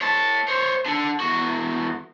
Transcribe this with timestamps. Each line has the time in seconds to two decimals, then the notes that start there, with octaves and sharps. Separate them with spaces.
0.01 C#5 A5
0.48 C5 C#5
0.86 D4 A4
1.20 E2 F#4